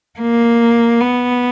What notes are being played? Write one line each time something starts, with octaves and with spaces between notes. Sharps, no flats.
A#3
B3